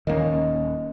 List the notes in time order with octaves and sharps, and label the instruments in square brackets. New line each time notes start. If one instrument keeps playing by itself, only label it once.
[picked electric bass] D#1 C#4 [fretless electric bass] D#3 A#3 [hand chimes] D#5